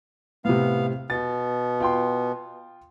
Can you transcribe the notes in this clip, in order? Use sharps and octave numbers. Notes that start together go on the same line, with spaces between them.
A2 C3 B3 F5
B2 B3 A6
F4 G5 C6